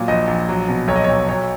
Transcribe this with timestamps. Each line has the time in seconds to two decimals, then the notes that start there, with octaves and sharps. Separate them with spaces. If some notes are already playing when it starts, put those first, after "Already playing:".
Already playing: A#2 F#3
0.08 A#1 D#5
0.28 A#1
0.49 F#3
0.69 B2
0.88 B1 C#5
0.96 D#5
1.04 B1 C#5
1.29 F#3 C#5